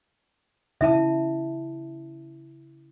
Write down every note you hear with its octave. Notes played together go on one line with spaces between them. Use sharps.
C#3 E4 E5 A5